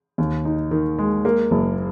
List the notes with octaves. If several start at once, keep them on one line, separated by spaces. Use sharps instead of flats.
D#2
D#4
D#3
G#3
A#3
F#1